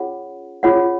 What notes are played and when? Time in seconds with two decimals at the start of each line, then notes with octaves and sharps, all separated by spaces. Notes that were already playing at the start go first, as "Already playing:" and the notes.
Already playing: C#4 F4 G#4 C#5 F#5
0.63 C#4 F4 G#4 C#5 F#5